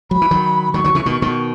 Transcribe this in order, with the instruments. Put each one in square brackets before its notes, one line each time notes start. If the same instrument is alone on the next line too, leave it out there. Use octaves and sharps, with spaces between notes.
[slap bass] F#3 [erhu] B5
[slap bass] E3
D#3 F#3
[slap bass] D#3 F#3 [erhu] C#6
[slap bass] D#3 F#3
C#3 E3
B2 D#3
B2 D#3